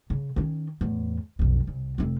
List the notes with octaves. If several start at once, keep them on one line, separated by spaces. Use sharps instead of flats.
C#3
D#3 C#4
E2 A2
B1 F2
C2
F1 C4